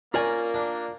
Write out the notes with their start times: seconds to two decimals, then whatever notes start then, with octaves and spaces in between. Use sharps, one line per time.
0.14 A#3 C#4 F4 A#4 D5 G#5
0.54 D4